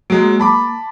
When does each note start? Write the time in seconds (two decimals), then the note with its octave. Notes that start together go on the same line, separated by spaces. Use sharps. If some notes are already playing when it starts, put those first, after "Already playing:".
0.10 F#3 G#3 A#3
0.39 A5 B5 D6